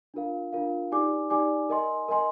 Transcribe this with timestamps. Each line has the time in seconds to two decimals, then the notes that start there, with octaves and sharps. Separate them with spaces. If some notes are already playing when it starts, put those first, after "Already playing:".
0.14 D4 F4 A#4 F5
0.53 D4 F4 A#4 F5
0.92 D#4 G4 D5 G#5 D6
1.30 D#4 G4 D5 G#5 D6
1.70 A#4 D#5 G#5 C6
2.08 A#4 D#5 G#5 C6